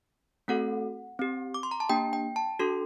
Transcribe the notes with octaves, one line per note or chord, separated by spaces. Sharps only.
A3 C4 F#4 A4 F#5
C4 G4
D6
C6
A#5
A5
A#3 D4 G4 G5
G5
A5
D4 F#4 A4 C6